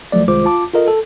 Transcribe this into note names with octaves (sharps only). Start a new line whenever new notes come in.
C2 F3 F#3 A3 D5
C2 D#3 G#3 F4 C5 D6
F4 A5 D6
F4 A4 A#4 D#5
A4